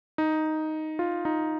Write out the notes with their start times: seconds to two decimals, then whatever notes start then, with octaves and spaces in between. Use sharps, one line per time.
0.18 D#4
0.99 F4
1.25 D#4